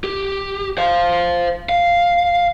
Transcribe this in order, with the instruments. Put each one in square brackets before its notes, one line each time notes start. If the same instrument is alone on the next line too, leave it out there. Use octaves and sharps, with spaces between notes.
[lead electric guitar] G4
C5 F5
F5